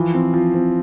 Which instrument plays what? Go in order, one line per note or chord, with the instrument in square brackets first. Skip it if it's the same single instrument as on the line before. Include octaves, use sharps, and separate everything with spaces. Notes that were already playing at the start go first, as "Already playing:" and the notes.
Already playing: [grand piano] E3 F3
C4
F3
C4